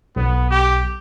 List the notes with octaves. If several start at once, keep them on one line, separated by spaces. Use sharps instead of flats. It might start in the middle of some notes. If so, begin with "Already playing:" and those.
B1 B3
G4